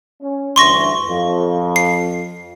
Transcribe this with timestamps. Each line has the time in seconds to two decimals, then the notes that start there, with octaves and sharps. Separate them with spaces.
0.21 C#4
0.56 D2 G2 E3 C6 C#6 A#6
1.08 F2
1.76 C7